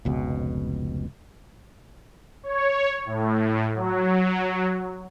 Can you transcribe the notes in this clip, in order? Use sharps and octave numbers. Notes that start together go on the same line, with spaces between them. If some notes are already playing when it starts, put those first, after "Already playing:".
F1 C#2 B2
C#5
A2
F#3